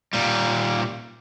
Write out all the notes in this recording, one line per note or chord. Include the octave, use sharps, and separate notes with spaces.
A#2 G3